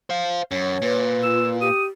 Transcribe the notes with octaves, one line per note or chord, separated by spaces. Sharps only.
C5 F5
F#2 C#5
A#2 B4
F4 E6
G4 D#6